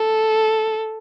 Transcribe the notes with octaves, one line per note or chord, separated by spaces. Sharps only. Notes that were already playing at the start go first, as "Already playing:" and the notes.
Already playing: A4